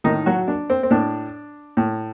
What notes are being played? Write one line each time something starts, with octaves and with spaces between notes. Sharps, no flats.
A2 D#3 D#4
F#3 F#4
D4
C4
C4
A2 D4
A2